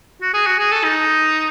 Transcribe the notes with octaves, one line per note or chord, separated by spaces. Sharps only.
F#4
G#4
F#4
G#4
A4
D#4